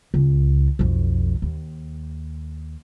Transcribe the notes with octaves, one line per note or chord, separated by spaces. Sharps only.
C#2
B1 F2
D#2